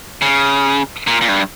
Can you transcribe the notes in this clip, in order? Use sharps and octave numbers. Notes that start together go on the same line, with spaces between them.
C#3
A#2
A#2
G2